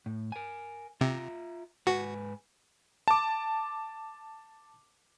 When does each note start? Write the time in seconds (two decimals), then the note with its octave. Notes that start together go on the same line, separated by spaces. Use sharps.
0.06 A2
0.32 A#4 G#5
1.01 C3 F4 E5 A#5
1.87 G#2 F#4 B4 G#5
3.08 A5 D6